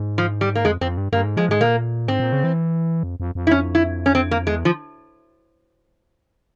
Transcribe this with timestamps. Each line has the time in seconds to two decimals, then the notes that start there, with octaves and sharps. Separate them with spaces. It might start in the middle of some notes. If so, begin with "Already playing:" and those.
Already playing: G#2
0.18 F3
0.41 G3
0.55 A#3
0.65 F2 G#3
0.81 F2 C4
0.97 G2
1.12 G2 A#3
1.24 G#2
1.37 F3 G#3
1.49 G#2 G#3
1.60 A#2 A#3
2.08 G#2 C4
2.20 A#2
2.33 C#3
2.44 E3
3.03 F2
3.20 F2
3.35 F2
3.47 E4
3.51 C#4
3.75 E4
4.06 C#4
4.15 C4
4.31 A#3
4.47 E2 G#3
4.65 F3